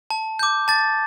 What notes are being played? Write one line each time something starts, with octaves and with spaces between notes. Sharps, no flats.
A5
D6 G6
A5 A6